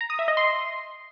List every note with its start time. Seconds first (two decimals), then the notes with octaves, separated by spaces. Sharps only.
0.01 A#5
0.10 D#6
0.19 E5
0.28 D#5
0.37 C6